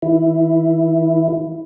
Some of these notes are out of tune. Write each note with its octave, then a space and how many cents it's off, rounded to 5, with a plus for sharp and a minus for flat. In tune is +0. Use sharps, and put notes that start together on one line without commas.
E3 -40 E4 +0